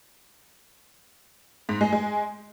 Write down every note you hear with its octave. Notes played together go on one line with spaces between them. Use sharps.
G#2
G#3
G#3